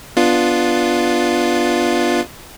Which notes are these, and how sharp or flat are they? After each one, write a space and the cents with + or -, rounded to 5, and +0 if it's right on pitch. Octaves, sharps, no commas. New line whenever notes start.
B3 +0 D4 +0 F4 +0